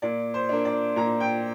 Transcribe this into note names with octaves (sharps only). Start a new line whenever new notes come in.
A#2 D5
C5
A#3 D4
D5
A#2 A#5
G5